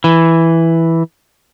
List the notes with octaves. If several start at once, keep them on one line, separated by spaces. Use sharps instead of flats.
E3